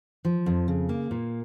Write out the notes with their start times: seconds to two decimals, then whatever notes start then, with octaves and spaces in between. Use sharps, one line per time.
0.25 F3
0.46 F2
0.68 C#3
0.89 A#3
1.11 A#2